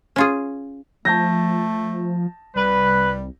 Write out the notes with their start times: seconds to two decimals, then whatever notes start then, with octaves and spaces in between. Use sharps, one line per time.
0.16 C#4 F4 G#4
1.05 F3 A3 A5 G6 A#6
2.56 C2 G3 B4